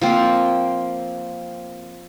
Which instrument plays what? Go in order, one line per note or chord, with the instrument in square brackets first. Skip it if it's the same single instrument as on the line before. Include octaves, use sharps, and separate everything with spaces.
[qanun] F3 A#3 C4